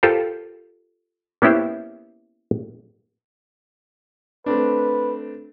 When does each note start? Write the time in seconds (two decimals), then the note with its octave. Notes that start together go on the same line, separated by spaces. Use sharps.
0.03 F4 G4 A4 A#4 C5
1.42 A#3 B3 C#4 E4 G4 C5
4.46 A3 C4 D4 B4